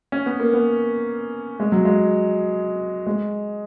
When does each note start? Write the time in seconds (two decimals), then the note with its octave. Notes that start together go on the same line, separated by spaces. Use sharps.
0.12 C#4
0.26 B3
0.40 A#3
0.54 B3
1.60 G#3
1.72 F#3
1.85 G#3
3.07 G#3